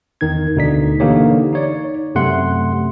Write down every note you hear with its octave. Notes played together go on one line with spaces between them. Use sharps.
E2 D#3 D#4 G#6
D2 B2 D3 D#4 D5 B6
D3 E3 A#3 D#4 G4 C#5
D#4 C#5 D5
F#2 C3 A3 F#5 C6